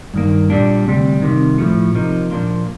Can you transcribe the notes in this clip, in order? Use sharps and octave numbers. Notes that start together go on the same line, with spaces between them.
G2 D#3 A#3
A#2 G3 D4
D2 C3 G3
C2 C3 D#3
A2 F3 A3
C3 F3 A#3 D#4
A#2 F3 A#3 D4 F4